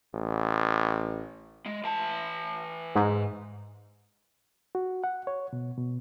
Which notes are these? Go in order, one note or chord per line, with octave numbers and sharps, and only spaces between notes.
A1
G#3
E3 A5
G#2
F#4
F#5
C#5
B2
B2